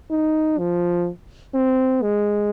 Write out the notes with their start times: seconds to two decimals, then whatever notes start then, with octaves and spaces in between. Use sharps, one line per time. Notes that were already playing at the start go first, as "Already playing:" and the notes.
0.10 D#4
0.58 F3
1.54 C4
2.02 G#3